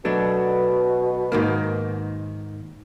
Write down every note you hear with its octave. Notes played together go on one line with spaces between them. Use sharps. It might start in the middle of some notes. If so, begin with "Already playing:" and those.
B2 F#3 A3 D4
G#2 D#3 A#3